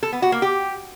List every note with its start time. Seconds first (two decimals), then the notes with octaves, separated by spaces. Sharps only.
0.03 A4
0.12 B3
0.22 F#4
0.32 A#3
0.42 G4